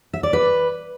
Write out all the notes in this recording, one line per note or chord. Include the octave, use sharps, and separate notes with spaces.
E5
D5
B4